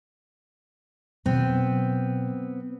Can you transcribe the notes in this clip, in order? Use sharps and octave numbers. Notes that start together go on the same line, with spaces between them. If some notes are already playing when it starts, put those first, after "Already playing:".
B2 F#3 B3 C4